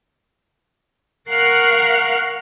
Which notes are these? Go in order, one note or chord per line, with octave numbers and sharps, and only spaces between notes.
A#4 F5 F#5 C#6 F6 F#6